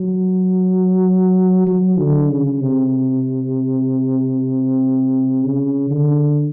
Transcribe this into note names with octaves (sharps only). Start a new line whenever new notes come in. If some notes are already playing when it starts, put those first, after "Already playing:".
Already playing: F#3
F#3
D3
C#3
C3
C#3
D3